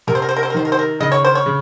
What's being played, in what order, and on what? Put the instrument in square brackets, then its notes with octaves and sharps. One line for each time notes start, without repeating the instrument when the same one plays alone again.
[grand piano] C3 [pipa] A#4
[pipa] C5
A#4
C5
A#4
C5
A#4
[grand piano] D#3 [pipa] C5
[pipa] A#4
C5
A#4
[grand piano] C#3 [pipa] D#5
[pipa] C#5
C5
C#5
[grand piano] C#3